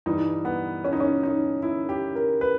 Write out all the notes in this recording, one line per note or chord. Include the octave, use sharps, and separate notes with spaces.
G2 E3 G3 D#4
B3
C#4
D#4
C#4
D#4
E4
G4
A#4
B4